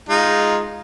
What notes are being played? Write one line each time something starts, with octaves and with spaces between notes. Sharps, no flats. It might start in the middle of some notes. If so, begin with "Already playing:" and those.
G#3 D#4 F4